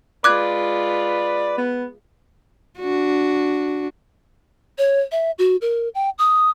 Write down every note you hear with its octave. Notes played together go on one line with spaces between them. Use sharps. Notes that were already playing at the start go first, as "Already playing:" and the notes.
G#3 F4 B4 D5 D6 F#6 G#6
B3
D4 F#4
C#5
E5
F#4
A#4
G5
D#6